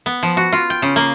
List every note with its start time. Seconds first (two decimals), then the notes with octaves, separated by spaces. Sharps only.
0.06 B3
0.23 F3
0.37 F#4
0.53 F4
0.70 G5
0.82 C#3
0.96 A#3